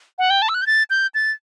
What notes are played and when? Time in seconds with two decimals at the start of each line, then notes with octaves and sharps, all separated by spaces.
0.18 F#5
0.30 G5
0.42 A5
0.49 E6
0.54 F#6
0.62 G6
0.66 A6
0.90 G6
1.14 A6